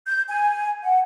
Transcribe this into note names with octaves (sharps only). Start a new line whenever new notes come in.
G6
G#5
F#5